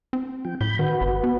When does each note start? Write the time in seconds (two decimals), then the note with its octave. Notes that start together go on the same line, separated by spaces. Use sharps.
0.13 C4
0.45 F3 G5
0.61 A2 B5 G6
0.79 D#3 F#4 B4
1.01 G1
1.24 B3